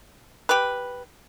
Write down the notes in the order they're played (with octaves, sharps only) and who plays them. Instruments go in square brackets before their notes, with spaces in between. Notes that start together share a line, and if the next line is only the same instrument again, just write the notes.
[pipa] G4 B4